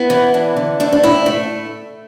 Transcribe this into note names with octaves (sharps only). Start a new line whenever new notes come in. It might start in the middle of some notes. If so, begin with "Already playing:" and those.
Already playing: B3 E4
E3
D4
D3
A3 D4
D4
A2 E4
A3